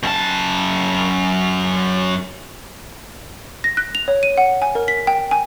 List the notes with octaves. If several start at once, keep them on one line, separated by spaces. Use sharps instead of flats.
F#2 A5
A#6
F#6
F7
C#5
D#7
F#5
G#5
A#4
B6
G5
G#5